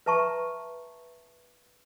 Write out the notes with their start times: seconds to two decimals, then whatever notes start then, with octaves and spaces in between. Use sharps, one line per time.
0.06 B4 E5 A5 A#5 C#6